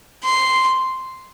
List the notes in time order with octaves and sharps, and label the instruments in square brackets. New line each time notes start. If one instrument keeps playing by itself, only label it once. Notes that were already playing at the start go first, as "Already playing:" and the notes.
[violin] C6